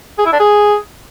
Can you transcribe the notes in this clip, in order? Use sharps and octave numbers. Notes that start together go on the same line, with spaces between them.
G#4
E4
D4
G#4